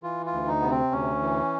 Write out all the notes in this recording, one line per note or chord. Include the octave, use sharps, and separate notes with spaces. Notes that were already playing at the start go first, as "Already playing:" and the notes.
E3 F4
F4
D2
D#4
C3 B3
C4
D2 C#4
E3